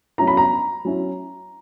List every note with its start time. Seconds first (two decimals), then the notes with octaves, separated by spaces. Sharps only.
0.18 F#3 C#4 E4 A#5
0.27 B5
0.37 A#5
0.85 F#3 C#4 E4